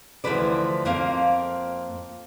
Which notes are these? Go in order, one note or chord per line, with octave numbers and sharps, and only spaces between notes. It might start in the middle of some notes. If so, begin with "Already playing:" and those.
D2 E3 F3 F#4 B4 D5
F2 A#3 C4 F5